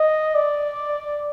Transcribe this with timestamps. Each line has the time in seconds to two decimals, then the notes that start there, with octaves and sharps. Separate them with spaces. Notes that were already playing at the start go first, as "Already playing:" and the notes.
Already playing: D#5
0.35 D5